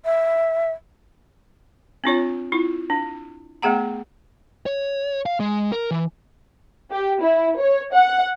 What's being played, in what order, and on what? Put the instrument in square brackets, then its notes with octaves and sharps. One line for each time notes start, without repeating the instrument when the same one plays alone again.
[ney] E5
[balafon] C4 D4 F4 C#5
E4 F4
D4
A3 B3 G#4 F#5 A#5
[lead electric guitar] C#5
F5
G#3
A#4
E3
[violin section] G4
E4
C#5
F#5